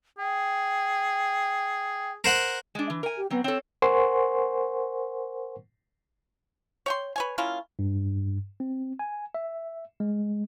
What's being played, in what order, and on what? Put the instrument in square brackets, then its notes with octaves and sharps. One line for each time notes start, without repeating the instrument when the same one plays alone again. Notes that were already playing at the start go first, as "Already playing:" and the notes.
[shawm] G#4 [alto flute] G5
[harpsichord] A#4 C5 F#5
[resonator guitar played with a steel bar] G#3 D4
E3
A#4 G#5
[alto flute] G4
[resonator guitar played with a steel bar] F#3 C4 [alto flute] B3
[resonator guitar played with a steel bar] C4 A4 [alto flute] C#5
[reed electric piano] A#4 C5 F#5 G#5 C6 C#6
[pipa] C#5 G5 C6
B4 C#5 G#5
A#3 C#4 E4 F4
[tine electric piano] G2
C4
G#5
E5
G#3